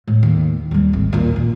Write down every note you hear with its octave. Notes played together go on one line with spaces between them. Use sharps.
A2
D#2
D#2 G3
G#1
D#1 A#2
A#2